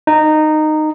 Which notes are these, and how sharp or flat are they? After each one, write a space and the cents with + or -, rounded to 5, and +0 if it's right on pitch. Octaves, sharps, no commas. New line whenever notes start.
D#4 -15